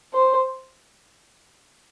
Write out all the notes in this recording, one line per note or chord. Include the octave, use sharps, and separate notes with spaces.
C5